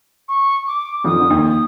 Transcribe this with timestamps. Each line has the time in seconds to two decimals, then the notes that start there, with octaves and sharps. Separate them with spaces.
0.28 C#6
0.67 D6
1.04 F2 F3 D#6
1.20 D3
1.30 D#2 D#3
1.44 D#6